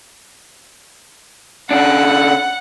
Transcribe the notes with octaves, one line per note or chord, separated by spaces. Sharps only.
C#3 D4 F#5